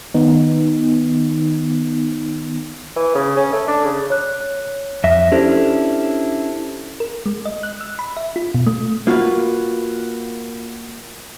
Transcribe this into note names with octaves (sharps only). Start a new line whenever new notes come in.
D#3 B3 D#4
E3
C#3
C#4
A3
D4
C#3
C#5 F#6
F2 E5 A#6
C#4 D4 E4 G4 A4 C5
A#4
G#3
D#5
F#6
E6
B5
E5
F4
B2
A3
A#3 F4 F#4 B4